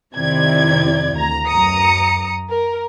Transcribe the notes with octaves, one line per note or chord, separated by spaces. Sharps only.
F2 C3 D#3 E4 D5 G#6
D2 A#5
F#2 A#5 D#6 C#7
A#4